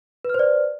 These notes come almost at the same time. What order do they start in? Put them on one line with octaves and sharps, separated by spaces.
B4 F6 C5 D5